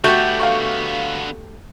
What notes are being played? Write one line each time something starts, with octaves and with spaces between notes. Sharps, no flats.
D3 A3 B3 F#4 G4 G6
F5 C#6